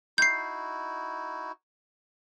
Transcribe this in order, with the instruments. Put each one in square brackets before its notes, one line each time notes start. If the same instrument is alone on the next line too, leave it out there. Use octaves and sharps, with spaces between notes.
[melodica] D#4 E4 F#4 [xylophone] G6 C7